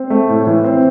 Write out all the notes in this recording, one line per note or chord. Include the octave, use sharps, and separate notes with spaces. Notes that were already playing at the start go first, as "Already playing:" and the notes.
Already playing: C4
A3
A2
E3
C4